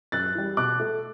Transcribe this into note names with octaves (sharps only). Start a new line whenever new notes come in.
F#2 F#6 A6
E3 G3
B2 D6 F#6
A3